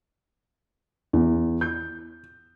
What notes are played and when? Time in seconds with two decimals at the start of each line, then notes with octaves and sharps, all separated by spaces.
1.13 E2
1.61 G6